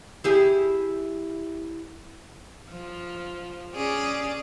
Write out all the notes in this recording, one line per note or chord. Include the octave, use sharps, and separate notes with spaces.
E4 G4 G#4
F3
C#4 G#4 D5